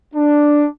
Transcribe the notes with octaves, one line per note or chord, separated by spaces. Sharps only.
D4